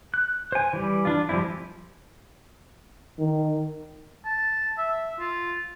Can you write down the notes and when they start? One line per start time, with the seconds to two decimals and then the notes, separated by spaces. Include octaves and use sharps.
0.14 F#6
0.52 C5 G#5
0.73 E3 G3
1.05 D4 F4
1.29 F3 G3 G#3 C4 E4
3.19 D#3
4.24 A5
4.78 E5
5.20 F4